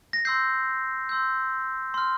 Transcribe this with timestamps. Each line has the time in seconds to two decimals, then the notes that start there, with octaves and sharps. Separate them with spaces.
0.13 A#6
0.25 C6 E6 G6 C7
1.09 C6 E6 G6
1.94 C6 F6